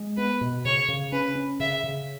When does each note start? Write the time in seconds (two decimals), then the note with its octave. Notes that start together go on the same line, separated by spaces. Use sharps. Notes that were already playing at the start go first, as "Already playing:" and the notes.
Already playing: G#3
0.17 B3 B4
0.41 B2
0.65 C#3 C#5
0.88 C#3
1.12 C#4 B4
1.36 C#4
1.60 C#3 E5
1.84 C#3